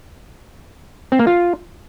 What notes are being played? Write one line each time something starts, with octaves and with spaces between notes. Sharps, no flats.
C4
A#3
F4